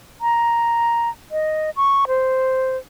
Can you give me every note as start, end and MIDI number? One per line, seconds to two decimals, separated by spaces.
0.21 1.09 82
1.32 1.70 75
1.76 2.05 85
2.08 2.77 72